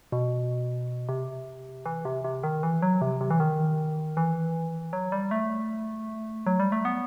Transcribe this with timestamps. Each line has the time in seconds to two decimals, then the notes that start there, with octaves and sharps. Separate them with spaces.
0.12 B2
1.09 C3
1.86 E3
2.05 C3
2.24 C3
2.43 D#3
2.63 E3
2.82 F#3
3.02 C3
3.21 C3
3.30 E3
3.40 D#3
4.17 E3
4.93 F#3
5.12 G3
5.31 A3
6.46 F#3
6.60 G3
6.72 A3
6.85 B3